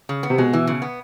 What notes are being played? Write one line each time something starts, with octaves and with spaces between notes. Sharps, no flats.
C#3
B3
C3
B2 G#3
E3
C#3
B3